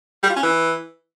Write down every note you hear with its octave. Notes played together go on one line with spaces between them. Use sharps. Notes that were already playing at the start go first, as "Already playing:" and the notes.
G3
F4
C#4
E3